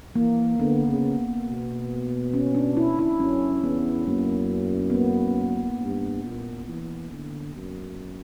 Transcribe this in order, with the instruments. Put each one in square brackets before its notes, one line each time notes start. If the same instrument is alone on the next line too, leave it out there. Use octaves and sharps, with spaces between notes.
[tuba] E3 [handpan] A#3
[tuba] D3 [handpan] B3
[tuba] C#3
B2
[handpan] C#4
D4
E4
E4
[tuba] F#2 [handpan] C#4
[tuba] E2 [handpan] B3
[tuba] F#2 [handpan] A#3
[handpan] B3
A#3
[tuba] G2
A#2
E3
D3
F#2